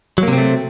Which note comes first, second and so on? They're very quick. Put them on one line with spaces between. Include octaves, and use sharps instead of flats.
F#3 A#3 C3 C4 A3